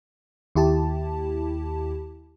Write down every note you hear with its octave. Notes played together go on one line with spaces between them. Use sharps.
D#2 E4 G4 A5